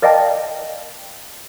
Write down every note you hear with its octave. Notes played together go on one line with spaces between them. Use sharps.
A#4 D5 D#5 F5 G5 A5